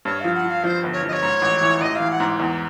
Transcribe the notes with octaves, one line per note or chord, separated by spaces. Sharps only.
G2 C#5
F3 F5
F#5
F3 F5
F3 C5
G1
C#5
F3 D#5
C#5
G#2
A1
E3
A1 D#5
E3 F5
F#5
G#2
E2